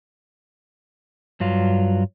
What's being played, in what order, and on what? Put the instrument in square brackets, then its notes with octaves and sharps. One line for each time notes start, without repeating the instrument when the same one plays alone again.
[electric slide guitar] G2 F#3 F4